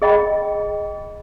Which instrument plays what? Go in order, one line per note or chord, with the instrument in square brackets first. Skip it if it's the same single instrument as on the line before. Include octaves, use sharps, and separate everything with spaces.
[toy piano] G#4 D#5 G5 B5